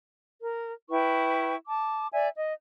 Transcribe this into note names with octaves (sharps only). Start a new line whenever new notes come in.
A#4
E4 B4 G5 C#6
A5 D6
D5 E5 G#5
D#5